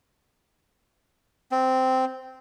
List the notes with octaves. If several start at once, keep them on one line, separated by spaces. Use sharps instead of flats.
C4